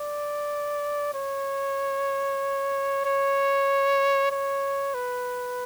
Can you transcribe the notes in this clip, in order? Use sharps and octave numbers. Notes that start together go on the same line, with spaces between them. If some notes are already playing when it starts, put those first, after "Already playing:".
Already playing: D5
C#5
C#5
C#5
B4